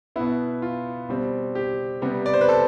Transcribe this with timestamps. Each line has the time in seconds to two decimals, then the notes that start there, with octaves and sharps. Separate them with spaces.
0.16 B2 B3 E4
0.62 F4
1.08 B2 G3 C4
1.55 G4
2.02 C3 G3 B3
2.26 D5
2.33 C5
2.41 B4
2.49 A4